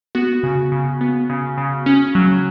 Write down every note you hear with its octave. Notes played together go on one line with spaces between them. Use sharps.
B3 F#4
C#3
C#3
B3
C#3
C#3
C#4
F#3